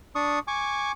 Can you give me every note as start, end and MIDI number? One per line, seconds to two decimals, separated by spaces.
0.15 0.39 62
0.15 0.39 85
0.15 0.39 87
0.47 0.92 80
0.47 0.92 85
0.47 0.92 86